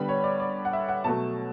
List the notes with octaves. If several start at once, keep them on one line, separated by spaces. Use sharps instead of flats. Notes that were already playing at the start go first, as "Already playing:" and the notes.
Already playing: D3 G3 B3 B5
C#5
D5
D5
F#5
E5
F#5
B2 F#3 A3 A5